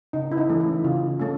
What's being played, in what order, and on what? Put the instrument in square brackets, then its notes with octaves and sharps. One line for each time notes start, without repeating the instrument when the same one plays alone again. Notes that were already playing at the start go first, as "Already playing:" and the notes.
[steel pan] C#3 D#4
E4
D#4
E3 A3 C#4
E4
C#3 F4
A3 C#4